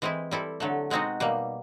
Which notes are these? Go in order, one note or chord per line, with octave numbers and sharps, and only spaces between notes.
E3 G#3 C4 E4
G3 C4 E4 A4
D3 F#3 A3
B2 G#3 C4 D#4 F#4
B2 G3 A#3